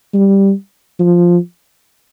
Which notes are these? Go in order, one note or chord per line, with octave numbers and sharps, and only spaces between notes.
G3
F3